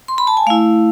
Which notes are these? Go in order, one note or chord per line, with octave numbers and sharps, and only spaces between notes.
C6
B5
A5
G#5
A3 E4 F5